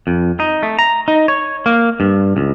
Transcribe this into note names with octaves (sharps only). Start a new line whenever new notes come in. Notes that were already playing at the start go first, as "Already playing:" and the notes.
F2
D#4
A3
A#5
D#4
C#5
A#3
G2
C#2